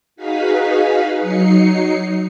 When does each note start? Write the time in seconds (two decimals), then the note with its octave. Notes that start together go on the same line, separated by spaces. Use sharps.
0.16 D#4 F#4 G#4 B4 F5 B5
1.20 F#3 D#4 C7 C#7